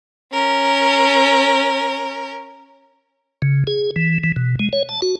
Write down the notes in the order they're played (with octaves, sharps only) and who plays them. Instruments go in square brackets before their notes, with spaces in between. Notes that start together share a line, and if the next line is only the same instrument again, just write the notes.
[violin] C#4 A#4
[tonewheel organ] C#3
G#4
E3
E3
B2
G#3
C#5
A5
F#4